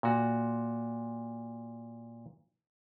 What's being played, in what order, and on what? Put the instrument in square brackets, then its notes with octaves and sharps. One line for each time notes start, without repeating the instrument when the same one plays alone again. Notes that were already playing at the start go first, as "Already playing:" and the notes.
[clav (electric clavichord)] A#2 F#4